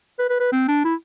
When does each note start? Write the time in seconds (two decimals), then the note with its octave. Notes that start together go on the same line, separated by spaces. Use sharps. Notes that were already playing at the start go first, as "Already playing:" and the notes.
0.19 B4
0.29 B4
0.40 B4
0.52 C4
0.68 D4
0.85 E4